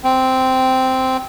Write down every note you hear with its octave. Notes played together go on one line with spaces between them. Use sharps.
C4